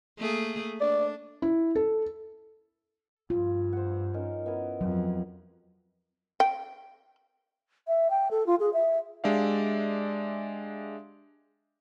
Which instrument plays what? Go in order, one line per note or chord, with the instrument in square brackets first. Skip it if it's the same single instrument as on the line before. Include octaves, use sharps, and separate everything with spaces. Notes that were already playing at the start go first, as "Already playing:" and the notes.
[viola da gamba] A3 A#3 G#4
[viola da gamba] D4 [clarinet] D5
[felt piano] E4
A4
[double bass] G2 [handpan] F4
[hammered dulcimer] C5 F#5
C#4 D#4 A#4
B3 E4 A#4
[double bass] F2 [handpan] F#3
[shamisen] G5
[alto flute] E5
G5
A4
F4
G#4
E5
[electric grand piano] G#3 D4 G4 D5 E5 F5